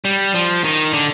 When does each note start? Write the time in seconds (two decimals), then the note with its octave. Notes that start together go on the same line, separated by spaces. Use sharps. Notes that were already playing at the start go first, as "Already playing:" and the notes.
0.05 G3
0.34 F3
0.64 D#3
0.94 D3